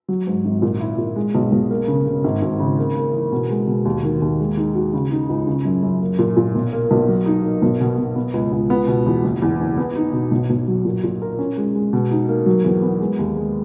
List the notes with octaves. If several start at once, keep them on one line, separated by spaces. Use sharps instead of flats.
F#3
G#2
G#1
A#2
E4
A#2
G#3
B1
B1
A#3
C#3
C#3
G#1
G#1
C#3
A#3
A#3
E3
B2
G#3
B2
D#2
D#3
D#2
G#3
D#4
F#4
C#3
D#4
C#2
C#3
F#2
F#2
A#3
A#2
A#2
B1
A#3
B1
F#3
D#4
A#3
B1
B2
B2
B3
C#2
C#2
B3
B2
E2
F#1
E2
F#1
B3
D#4
B2
B1
B1
F#3
A#2
A#2
A#4
C#4
G#3
G#3
B2
D#4
A#3
F#3
E2
B3
G#3
D#2
G#3